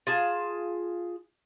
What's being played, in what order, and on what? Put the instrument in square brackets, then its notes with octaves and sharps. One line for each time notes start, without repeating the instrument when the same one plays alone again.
[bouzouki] F4 G#4 A5